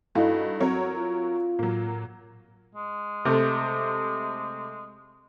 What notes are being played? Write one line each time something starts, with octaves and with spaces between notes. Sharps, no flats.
G2 D#4 E4 F#4 A4 F5 G5
F#3 C4 F#4 A#4 C#5
F4
A2 F#3 A#3
G#3
C3 A3